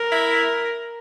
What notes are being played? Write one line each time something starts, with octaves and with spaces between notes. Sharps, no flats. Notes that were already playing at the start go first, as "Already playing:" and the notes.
Already playing: A#4
E4